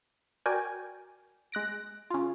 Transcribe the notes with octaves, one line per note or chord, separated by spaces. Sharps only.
F#4 A#4 D5 G5 G#5
G#3 F#6 A#6 D7
C#3 F4